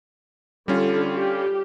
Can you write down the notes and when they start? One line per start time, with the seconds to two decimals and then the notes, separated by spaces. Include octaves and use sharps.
0.68 D3 G3 C#4 F4 A4
1.14 G4